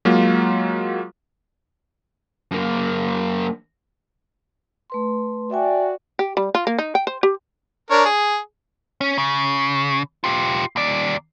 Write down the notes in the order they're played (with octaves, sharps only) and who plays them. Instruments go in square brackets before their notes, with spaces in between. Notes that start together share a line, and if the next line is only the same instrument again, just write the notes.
[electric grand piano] F#3 G#3 A#3 F4
[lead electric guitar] F#2 A#3
[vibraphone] A3 B4 C6
[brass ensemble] F#4 D5 [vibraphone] E5 G5 G#5
[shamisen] G4
G3
F4
A#3
D#4
G5
C5
G4
[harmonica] D4 A#4 C#5
G#4
[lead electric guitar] C#4
C#3
F4 G4
D#2 D5